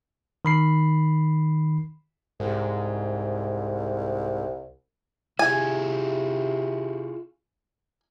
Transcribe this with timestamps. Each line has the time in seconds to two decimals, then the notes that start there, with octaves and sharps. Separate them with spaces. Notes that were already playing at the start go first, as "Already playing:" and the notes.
0.45 D#3 B5 C7
2.40 C2 G#2
5.39 C3 E4 F4 G#4 G#5